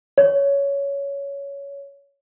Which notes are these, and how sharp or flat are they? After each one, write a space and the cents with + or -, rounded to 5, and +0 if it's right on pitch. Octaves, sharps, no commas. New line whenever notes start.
C#5 +15